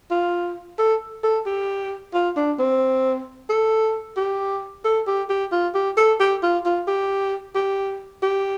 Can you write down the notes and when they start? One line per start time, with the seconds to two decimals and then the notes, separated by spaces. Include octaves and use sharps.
0.11 F4
0.79 A4
1.24 A4
1.46 G4
2.14 F4
2.37 D4
2.59 C4
3.50 A4
4.17 G4
4.85 A4
5.07 G4
5.30 G4
5.52 F4
5.75 G4
5.97 A4
6.20 G4
6.43 F4
6.65 F4
6.88 G4
7.55 G4
8.23 G4